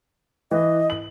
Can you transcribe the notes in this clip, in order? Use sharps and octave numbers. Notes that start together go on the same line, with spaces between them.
E3 D#5
F#7